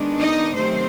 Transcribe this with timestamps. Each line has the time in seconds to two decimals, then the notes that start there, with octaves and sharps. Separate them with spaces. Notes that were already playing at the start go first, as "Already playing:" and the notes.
Already playing: D#3 G#3 B3 D4
0.19 D#4 D#5
0.55 C3 D#3 F#3 A3 C4 C5